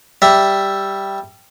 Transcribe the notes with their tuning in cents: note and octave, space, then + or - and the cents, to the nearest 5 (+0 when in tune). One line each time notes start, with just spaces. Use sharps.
G3 +0 E5 +0